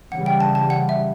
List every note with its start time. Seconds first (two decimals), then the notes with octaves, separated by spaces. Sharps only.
0.12 C#3 E3 G3 F#5
0.26 G5
0.40 A5
0.55 A5
0.70 F#5
0.89 E5